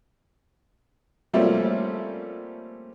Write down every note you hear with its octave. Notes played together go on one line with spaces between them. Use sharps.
F3 G3 A3 A#3 C4 C#4